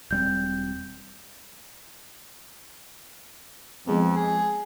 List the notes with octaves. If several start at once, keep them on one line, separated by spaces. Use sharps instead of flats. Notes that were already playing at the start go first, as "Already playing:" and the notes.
E1 G3 C4 G6
F2 F3 G#3 B3
G#4